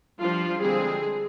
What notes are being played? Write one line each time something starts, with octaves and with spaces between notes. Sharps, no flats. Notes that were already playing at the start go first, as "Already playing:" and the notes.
F3 G3 D4 F4
D3 G3 G#3 C4 G#4